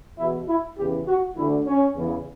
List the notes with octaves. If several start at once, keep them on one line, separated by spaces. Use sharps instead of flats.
E2 B2 E4
E4
E2 C#3 E3 G4
F#4
D2 D3 E4
C#4
E2 C#3 E3